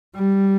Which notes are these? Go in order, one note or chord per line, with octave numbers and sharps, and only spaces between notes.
G3